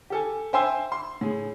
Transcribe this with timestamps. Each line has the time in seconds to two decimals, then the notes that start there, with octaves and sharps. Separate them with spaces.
0.10 G4 A4 G#5
0.53 C5 E5 G5 G#5 C6 E6
0.92 C6
1.21 A2 G#4